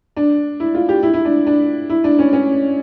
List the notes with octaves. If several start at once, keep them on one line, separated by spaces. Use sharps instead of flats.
D4
E4
F4
G4
E4
E4
D4
D4
E4
D4
C#4
C#4